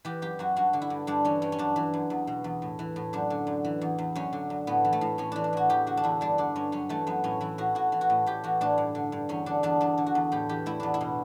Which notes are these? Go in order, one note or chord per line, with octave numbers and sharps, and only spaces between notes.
E3 G4
F#2 G4
F#2 F#4
G2 F#4
D3
E4
G2
G2 D4
E3 C#4
G2 C#4
C#4
F#2 D4
E3
F#2
E2
B2
E2
A2
E3
A2
F#2 D4
D3
F#2
E3
E2
E2
F#2 C#4
D3
F#2
A2 B3
E3
A3
A2
A2 C#4
E3 D4
D4
A2 F#4
E2 G4
D3 F#4
D4
E2 E4
G2 D4
D3 D4
G2 C#4
F#2 C#4
E3 A3
F#2 B3
A2 C#4
E3 E4
A2 F#4
A2 F#4
E3
F#4
A2
A2 G4
E3 F#4
A2 D4
G2
D3
G2
E2 C#4
D3 D4
E2 D4
E2 D4
D3
F#4
E2
A2 G4
E3 G4
A2 E4
E2 D4
E4
B2